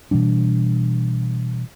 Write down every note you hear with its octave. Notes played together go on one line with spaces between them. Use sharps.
B2 E3 G3 D4